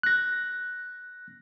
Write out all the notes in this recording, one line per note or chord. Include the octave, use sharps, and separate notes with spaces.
F#6 A#6